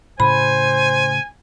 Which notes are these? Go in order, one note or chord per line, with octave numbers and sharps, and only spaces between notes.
A2 C#3 C5 G#5 B5